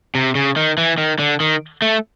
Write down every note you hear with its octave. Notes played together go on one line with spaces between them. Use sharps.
C3
C#3
D#3
E3
D#3
D3
D#3
A3